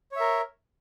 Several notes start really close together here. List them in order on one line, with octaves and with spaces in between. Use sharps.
C#5 E5 A#4